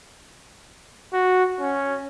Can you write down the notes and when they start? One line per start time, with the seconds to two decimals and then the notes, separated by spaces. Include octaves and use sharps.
1.13 F#4
1.60 C#4